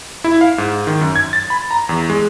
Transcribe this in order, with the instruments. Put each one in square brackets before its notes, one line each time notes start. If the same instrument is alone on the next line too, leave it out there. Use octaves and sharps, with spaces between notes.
[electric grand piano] E4
F5
G#2
D#3
F#2
G#6
A6
B5
A#5
E2
G#3